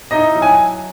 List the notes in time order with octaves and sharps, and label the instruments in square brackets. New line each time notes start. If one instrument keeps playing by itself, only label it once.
[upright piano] D#4 E4 D#5
F#3
G#5